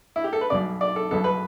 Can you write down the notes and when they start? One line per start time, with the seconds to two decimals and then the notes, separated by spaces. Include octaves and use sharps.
0.16 E4
0.24 G4
0.33 A4
0.41 B4
0.50 B1 B2 B3 D5
0.81 D5
0.96 A4
1.11 B1 B2 B3 A4
1.24 B4